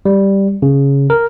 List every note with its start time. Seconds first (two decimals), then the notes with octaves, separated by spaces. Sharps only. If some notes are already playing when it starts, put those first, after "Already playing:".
0.05 G3
0.62 C#3
1.10 A#4